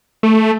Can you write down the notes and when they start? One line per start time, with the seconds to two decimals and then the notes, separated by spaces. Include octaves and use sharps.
0.23 A3